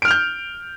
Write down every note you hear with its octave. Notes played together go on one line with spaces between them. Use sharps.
F6 G6 D7 F7